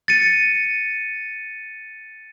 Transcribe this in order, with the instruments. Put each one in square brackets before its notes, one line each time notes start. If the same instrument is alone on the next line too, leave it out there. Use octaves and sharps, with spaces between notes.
[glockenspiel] A6 C#7 D#7